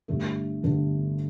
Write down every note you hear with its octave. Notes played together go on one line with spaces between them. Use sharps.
G1 G2 D3 A3
G1 G2 D3 A3